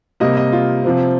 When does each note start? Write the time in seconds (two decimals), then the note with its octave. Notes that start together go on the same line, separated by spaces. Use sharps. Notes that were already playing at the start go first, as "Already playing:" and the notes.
0.20 C3 G3 A#3 D#5
0.37 D#5
0.53 F4
0.84 C3 F3 C4